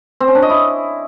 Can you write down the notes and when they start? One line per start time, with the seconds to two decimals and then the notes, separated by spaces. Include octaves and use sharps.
0.20 C4
0.28 C#4
0.35 D4
0.42 D#5
0.50 E4